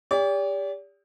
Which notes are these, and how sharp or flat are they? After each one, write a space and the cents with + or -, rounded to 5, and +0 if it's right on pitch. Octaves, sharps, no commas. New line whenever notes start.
G4 +35 D5 -40